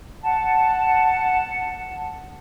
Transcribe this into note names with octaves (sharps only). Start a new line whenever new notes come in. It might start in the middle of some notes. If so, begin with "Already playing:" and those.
F#5 A5